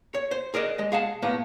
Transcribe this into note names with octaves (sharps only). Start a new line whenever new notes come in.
C#5
C5
G#4 A#4 D5 D#5
G#3 D#5
G#4 F5 F#5 A5
A2 A#3 B3